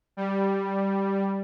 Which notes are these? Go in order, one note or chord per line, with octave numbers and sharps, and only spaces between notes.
G3